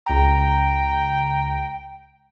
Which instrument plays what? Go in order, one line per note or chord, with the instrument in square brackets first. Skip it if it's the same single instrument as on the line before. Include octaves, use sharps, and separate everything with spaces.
[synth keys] C#2 A#5 [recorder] G5